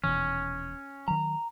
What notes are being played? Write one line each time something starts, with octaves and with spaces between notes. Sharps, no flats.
D#1 B2 E3 C#4
D#3 F#3 A#5